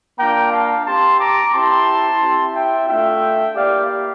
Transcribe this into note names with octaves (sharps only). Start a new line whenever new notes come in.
A#3 D4 F4 G5 A#5
F5 A5
C4 G4 A5 C6
A#5 D6
C4 E4 G4 A5 C6
C4 E4 G4
E5 G5
A3 D4 F4 E5 G5
A#3 E4 G4 D5 F5